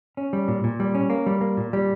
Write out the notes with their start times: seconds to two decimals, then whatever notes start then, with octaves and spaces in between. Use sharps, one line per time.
0.17 C#4
0.33 G3
0.48 A#2
0.64 A#2
0.80 G3
0.95 C#4
1.10 A#3
1.26 G3
1.41 A#3
1.57 A#2
1.73 G3